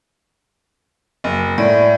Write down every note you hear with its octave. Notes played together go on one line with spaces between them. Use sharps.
F#1
A2 D5